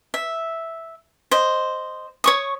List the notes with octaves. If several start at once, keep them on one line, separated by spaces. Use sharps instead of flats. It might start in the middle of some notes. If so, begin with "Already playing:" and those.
E5
C5 D#5
C#5 C#6 D#6